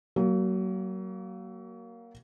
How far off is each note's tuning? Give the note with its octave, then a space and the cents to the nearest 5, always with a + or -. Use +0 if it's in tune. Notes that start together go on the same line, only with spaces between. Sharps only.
F#3 +30 A#3 +0